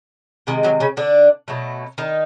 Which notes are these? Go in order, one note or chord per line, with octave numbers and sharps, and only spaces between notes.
C3 D#3 G#3 G#4
F#3 F#4
C#3 C#4
D3 D4
B2 F#3 A3
D#3 D#4